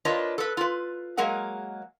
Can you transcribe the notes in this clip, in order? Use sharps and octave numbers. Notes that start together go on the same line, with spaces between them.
D4 F4 A#4 B4 C#5 D#5
A4 B4
F4 B4
F#3 G#3 A#3 G#4 A#4 F#5